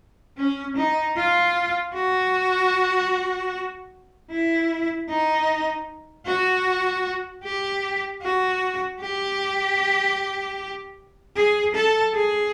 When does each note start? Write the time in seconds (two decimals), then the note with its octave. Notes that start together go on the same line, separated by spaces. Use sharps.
0.37 C#4
0.76 D#4
1.16 F4
1.94 F#4
4.30 E4
5.09 D#4
6.26 F#4
7.43 G4
8.22 F#4
9.01 G4
11.36 G#4
11.75 A4
12.14 G#4